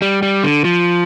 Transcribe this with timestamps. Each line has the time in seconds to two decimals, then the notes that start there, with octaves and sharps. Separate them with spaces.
0.02 G3
0.23 G3
0.43 D3
0.65 F3